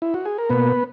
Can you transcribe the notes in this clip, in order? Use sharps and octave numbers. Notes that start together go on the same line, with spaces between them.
E4
F#4
G#4
A#4
B2 A#3 B3 B4